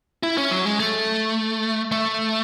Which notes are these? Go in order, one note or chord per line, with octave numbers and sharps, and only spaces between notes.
E4
C#4
F#3
G#3
A3
A3